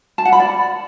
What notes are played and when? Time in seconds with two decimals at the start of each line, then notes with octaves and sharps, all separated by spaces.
0.18 A5
0.25 F#5
0.33 B5
0.40 D5